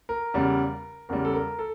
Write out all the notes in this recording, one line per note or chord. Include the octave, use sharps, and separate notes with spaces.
A#4
E2 C#3 G3
E2 C#3 G3 A#4
A4
A#4
A4